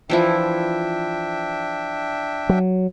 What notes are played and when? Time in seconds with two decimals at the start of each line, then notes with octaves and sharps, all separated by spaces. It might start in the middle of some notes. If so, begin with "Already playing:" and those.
0.10 E3 F3 D4 E4 E5 G5
2.49 F#3